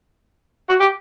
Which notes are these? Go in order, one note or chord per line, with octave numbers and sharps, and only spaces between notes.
F#4
G4